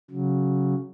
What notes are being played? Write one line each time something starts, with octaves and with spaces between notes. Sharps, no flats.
C#3 F#3